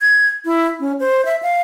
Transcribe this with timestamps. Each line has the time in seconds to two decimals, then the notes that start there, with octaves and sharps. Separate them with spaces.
0.01 G#6
0.45 E4
0.80 C#4
1.00 C5
1.25 E5
1.43 F5